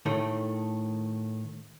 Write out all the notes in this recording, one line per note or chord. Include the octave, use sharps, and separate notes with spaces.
A2 D#3 A3